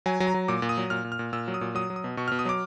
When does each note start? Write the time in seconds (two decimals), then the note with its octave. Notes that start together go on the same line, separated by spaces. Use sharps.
0.06 F#3 G#5
0.20 F#3
0.27 A#5
0.34 F#3
0.48 A#2 D6
0.62 A#2
0.69 D#6
0.77 F#3
0.90 A#2 F6
1.04 A#2
1.12 F6
1.19 A#2
1.33 A#2 E6
1.48 F#3
1.54 D#6
1.61 A#2
1.75 F#3 D#6
1.90 F#3
1.96 D#6
2.04 B2
2.17 B2 C#6
2.28 B2 F6
2.39 D#6
2.45 F#3 D6